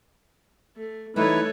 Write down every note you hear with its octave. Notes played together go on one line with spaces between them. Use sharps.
A3
E3 G3 A3 D#4 E4 A4 B4 C#5